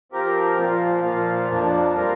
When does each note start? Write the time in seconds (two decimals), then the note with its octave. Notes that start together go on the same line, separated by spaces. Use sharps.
0.12 F3 C4 G4 A#4
0.57 A#2 F3 A#3 F4
1.04 A#2 F3 A#3 F4
1.49 F2 F3 A#3 D4
1.95 G3 C4 F4 A#4